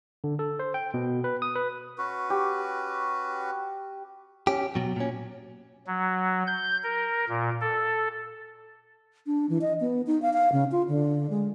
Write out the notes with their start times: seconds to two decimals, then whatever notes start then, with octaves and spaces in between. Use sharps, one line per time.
0.24 D3
0.39 A4
0.59 C5
0.74 G5
0.94 B2
1.24 B4
1.42 D#6
1.55 B4
1.98 C#4 F#4 B4
2.30 G4
4.47 C#4 G4
4.75 B2 F#3
4.96 A#2 C#4
5.87 F#3
6.47 G6
6.84 A#4
7.29 A#2
7.61 A4
9.27 D4
9.49 E3
9.61 D#5
9.80 B3
10.07 D#4
10.22 F5
10.33 F5
10.52 C#3
10.72 F4
10.88 D3
11.30 G#3